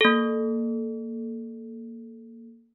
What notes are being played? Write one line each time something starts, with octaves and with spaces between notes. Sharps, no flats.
A#3 A4